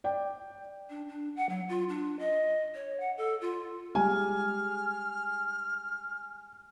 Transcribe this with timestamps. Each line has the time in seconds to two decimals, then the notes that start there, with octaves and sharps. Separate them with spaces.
0.04 D5 G5
0.90 D4
1.08 D4
1.36 F#5
1.49 F#3
1.69 F4
1.89 D4
2.19 D#5
2.75 C#5
3.00 F#5
3.17 A4
3.41 F4
3.95 G3 G#3 G4 G#5 F6